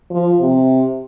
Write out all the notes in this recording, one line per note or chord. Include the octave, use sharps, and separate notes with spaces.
F3
C3